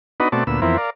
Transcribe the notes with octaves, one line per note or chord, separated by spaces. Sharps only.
B3 D4 D#4 F#4 B4 D#5
B2 A3 C4 F#4 D5 A5
D2 A#2 B3 E6
F2 E3 B3 C4 E4 A#4
A#4 D5 F5